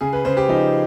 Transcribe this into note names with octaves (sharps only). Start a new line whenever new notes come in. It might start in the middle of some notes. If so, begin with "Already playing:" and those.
C#3 G#4
B4
C#3 C5
G4
F3 D#4